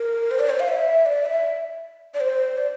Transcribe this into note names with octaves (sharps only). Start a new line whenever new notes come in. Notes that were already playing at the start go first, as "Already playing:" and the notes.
Already playing: A#4
C5
D5
C5
F5
E5
D5
E5
D5
C5
D5